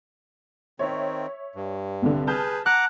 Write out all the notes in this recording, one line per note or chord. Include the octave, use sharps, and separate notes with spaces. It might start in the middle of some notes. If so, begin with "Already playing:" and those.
D#3 C4 C#5 E5
G2
C2 D3
G#4 B4 A5 F6 G6
F#5 A#5 D6 F#6